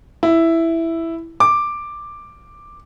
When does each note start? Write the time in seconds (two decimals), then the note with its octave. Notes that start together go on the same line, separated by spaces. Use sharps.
0.23 E4
1.40 D6